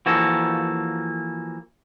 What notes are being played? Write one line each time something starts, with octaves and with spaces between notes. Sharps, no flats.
E3 F3 A#3 F#4 A4